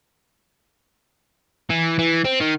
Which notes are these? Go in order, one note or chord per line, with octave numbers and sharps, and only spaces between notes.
E3
E3
C4
D#3